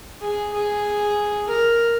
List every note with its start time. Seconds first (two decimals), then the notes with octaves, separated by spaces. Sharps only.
0.21 G#4
0.53 G#4
1.48 A#4